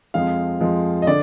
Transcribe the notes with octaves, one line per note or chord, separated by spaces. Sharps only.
F2 F3 G#3 F5
F2 F3 G#3
D#5
D3 D5